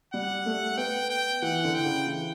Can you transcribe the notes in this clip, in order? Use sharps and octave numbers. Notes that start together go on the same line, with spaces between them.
G3 F#5
A3
B3 G5
G5
E3 F#5
D3
G5
C#3
E3